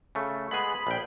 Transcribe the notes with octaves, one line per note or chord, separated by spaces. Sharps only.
C#3 A3
G#3 B3 G#4 B5
A#1 G5